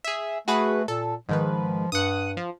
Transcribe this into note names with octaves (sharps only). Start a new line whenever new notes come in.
G#4 E5
A3 F#4 G#4 B4
A#2 A4
G#2 D#3 F3 B4
G2 F#5 D#6
F3